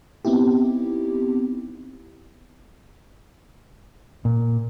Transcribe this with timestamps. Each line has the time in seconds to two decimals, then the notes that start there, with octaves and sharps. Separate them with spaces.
0.25 B3 C4 D#4 E4 G4
4.25 A#2